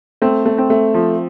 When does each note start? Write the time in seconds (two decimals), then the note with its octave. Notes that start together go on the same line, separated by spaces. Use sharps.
0.22 A3 C4
0.46 A3
0.58 C4
0.70 A3
0.94 F3